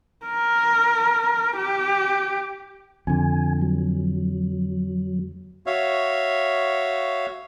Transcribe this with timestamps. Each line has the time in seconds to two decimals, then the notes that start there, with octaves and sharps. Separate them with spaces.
0.26 A#4
1.57 G4
3.07 F2 D3 G#5
3.62 F#3
5.66 F#4 C#5 E5 F5